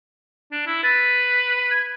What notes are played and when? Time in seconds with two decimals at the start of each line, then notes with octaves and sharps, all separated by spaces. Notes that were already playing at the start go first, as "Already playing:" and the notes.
0.52 D4
0.67 E4
0.83 B4 A6
1.71 G#6